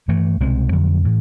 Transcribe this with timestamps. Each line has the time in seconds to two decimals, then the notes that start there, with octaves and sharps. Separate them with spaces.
0.08 G2 E3 A3
0.40 C2 B2 G#3 C4
0.72 F2 D3 F#3
1.05 A2 E3